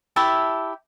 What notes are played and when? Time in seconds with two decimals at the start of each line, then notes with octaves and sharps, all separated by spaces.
0.16 E4 G4 E5 A5